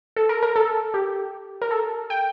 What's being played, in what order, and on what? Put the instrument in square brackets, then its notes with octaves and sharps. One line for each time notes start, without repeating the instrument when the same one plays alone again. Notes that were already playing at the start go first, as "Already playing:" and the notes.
[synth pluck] A4
A#4
A#4
A4
G4
A#4
A4
G5